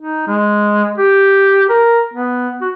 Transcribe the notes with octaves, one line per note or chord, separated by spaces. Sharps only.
D#4
G#3
G4
A#4
B3
F#4